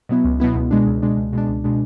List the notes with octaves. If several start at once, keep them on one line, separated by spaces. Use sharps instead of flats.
B2 F#3 B3 E4
C#2
B2 F#3 B3 E4
C#2
B2 G#3 D4
C#2
B2 G#3 D4
C#2
B2 G#3 D4
C#2
B2 G#3 D4